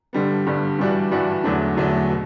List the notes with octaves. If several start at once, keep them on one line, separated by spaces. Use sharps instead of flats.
G2 D3 G3 B3
G2 D3 G3 B3
G2 E3 G3 D4 F#4
G2 E3 G3 D4 F#4
E2 D3 F#3 A3 D4
E2 D3 F#3 A3 D4
B2